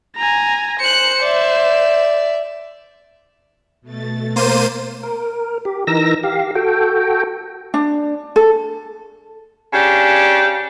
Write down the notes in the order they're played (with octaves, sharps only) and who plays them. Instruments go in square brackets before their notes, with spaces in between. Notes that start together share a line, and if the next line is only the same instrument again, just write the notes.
[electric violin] G#5 A#5
[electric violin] C5 [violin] F#6 C#7
[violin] D5 E5
[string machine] B2 A3 A6
[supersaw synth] A#3 C5 D#7
[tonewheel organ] A#4
G4
E3 D#4 A#4 E6 A#6
G4 F5
F#4 A4 G5
[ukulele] D4
A4
[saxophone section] C#3 D4 G4